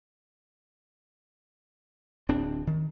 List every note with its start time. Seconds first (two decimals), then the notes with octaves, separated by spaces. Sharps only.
2.29 D1 C4 D4
2.67 D#3